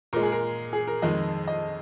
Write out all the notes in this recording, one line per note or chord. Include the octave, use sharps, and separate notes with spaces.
A#2 G#3 A#4
G#4
A#4
G#4
A#4
F2 D#3 G#3 D#5
D#5